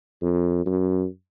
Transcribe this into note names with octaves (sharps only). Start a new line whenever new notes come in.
F2
F#2